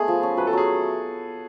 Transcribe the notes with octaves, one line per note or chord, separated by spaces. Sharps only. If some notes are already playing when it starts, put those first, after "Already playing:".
Already playing: G#3 A3 B3 G#4
F3
C#4
F#3 B4
A4
F#3 G#4